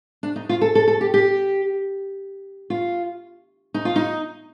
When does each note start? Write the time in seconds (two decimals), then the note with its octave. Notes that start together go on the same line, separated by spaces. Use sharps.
0.23 D4
0.36 D#4
0.49 F4
0.61 A4
0.75 A4
0.88 A4
1.01 G4
1.14 G4
2.70 F4
3.74 D#4
3.85 F4
3.96 D#4